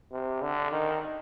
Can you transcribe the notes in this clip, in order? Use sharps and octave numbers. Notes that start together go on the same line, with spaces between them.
C3
D3
D#3